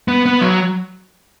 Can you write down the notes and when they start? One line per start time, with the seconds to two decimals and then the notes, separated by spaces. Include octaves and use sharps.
0.08 B3
0.26 B3
0.41 F#3